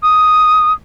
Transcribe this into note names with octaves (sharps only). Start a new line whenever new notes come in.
D#6